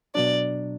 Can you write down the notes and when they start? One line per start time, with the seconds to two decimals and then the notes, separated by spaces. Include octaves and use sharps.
0.15 B2 F#3 D4 D5